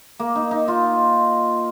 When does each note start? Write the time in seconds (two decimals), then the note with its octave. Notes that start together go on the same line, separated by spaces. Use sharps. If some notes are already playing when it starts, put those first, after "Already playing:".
0.20 A#3
0.36 D#4
0.51 D#4
0.68 F4